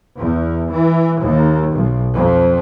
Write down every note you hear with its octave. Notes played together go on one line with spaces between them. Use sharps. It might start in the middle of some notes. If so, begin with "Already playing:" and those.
E2
E3
D#2
B1
F2